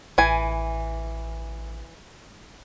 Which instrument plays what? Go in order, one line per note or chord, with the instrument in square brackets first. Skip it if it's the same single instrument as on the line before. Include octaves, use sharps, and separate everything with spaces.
[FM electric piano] A1 [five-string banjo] E3 G#5